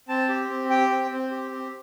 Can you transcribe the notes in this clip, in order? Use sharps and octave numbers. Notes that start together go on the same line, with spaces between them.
C4 A5
G4
C4
G4 G5
C4
C4
G4
C4